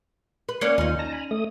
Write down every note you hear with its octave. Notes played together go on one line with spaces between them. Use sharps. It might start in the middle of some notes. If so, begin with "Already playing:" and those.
B4
A#3 C#4 C#5 D5 F#5
D#2 C#4 D#4 F4
A5 A#5 A#6
G#5 A#5 B5
A3 D#6